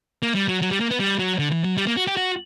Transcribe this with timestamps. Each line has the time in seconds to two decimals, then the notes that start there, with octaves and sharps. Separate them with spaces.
0.23 A#3
0.35 G3
0.48 F#3
0.62 F#3
0.71 G3
0.80 A#3
0.91 B3
0.99 G3
1.19 F#3
1.39 D3
1.52 E3
1.64 F#3
1.77 G3
1.87 A#3
1.97 F#4
2.07 G4
2.17 F#4